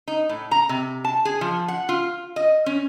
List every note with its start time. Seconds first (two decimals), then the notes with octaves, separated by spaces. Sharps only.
0.08 D#4
0.29 A2
0.51 A#5
0.69 C3
1.05 A5
1.25 G#4
1.41 F3
1.68 F#5
1.89 F4
2.36 D#5
2.66 C#4